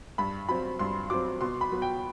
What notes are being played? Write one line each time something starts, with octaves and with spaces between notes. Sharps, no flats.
G2 B5
F#3 C4 B5
G2 C6
F#3 C4 D6
B2 C6
B5
F#3 B3
G5